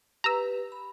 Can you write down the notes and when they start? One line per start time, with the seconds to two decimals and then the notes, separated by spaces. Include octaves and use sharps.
0.24 G4 B4 A#5 E6
0.72 B5